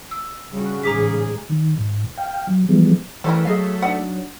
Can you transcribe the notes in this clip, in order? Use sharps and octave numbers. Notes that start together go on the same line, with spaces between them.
E6
C#3 G3 F#4
A1 G#2 G#4 A#5 D6 B6
D#3
G#2
F5 G5
F#3
E3 F3 G3 G#3 B3
E3 G3 A3 C#4 A#4
F#3 G#4 D#5 F5
D4 D#4 D5 F#5